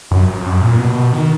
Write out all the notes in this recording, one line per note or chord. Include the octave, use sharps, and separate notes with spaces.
F#2
F#2
F2
F#2
A#2
B2
B2
D#3